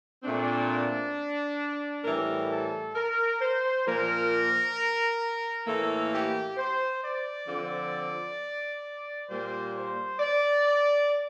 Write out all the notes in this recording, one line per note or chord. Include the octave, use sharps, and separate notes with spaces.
A#2 A3 C4 D4
A2 E3 G3 A#4
A4
A#4
C5
A#2 F3 A#3 A#4
A2 E3 A#3 A4
G4
C5
D5
D3 F3 C4
A#2 G3 A#3 C5
C5
D5